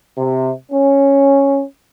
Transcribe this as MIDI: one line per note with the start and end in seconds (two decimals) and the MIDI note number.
0.18 0.51 48
0.71 1.62 61